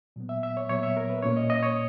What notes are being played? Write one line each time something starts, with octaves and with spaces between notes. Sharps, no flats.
A#2 F#3 B3
E5
E5
C#5
A#2 F#3 B3 C#5
E5
A#4
B4
A#2 A#3 C#4 C#5
D#5
D#5
C#5